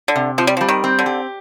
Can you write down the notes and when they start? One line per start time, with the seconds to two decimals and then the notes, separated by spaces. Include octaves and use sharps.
0.08 D3
0.16 C3
0.38 F3 C4
0.47 G3
0.57 F3
0.61 G3
0.69 D#3
0.84 C4
0.99 D3
1.06 G4